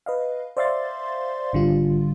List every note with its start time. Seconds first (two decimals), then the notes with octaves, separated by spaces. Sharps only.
0.06 B4 D#5 F5
0.57 C5 D5 E5 F5 C6 A6
1.53 G#1 D3 G3 F4